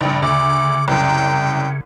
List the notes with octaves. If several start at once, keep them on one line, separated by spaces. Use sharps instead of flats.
A#1 G2 C#3 G5
D2 D6
C2 F#2 G5